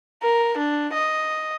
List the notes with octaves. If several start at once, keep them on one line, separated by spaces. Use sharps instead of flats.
A#4
D4
D#5